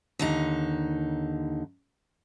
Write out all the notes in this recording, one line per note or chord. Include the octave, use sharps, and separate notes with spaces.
D#2 D3 D#4